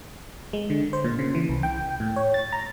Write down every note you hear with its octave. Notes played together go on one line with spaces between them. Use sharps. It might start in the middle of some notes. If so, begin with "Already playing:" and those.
G#3
D3
C5
A#2
C#3
E3
C2
G5
A2
C#5
A6
A#5